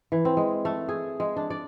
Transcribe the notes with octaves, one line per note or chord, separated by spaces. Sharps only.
E3
C4
G#3
A3
G#4
G#3
D4
D5